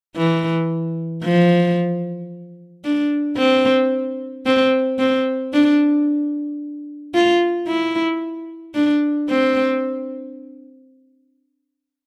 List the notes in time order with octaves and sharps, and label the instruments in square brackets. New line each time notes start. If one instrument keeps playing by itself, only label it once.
[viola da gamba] E3
F3
D4
C4
C4
C4
D4
F4
E4
D4
C4